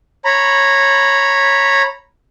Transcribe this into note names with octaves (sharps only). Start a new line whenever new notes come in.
C#5 A#5 B5